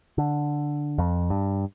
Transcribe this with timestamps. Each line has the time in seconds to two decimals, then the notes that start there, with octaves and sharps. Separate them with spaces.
0.18 D3
0.98 F2
1.30 G2